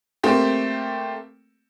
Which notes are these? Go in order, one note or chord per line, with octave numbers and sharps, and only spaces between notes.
A3 A#3 C4 G4